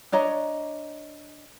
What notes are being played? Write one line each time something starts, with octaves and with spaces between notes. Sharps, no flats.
D4 C#5 D#5 A#5